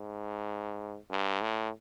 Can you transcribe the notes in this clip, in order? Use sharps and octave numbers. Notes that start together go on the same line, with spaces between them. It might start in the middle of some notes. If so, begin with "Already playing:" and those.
Already playing: G#2
G2
A2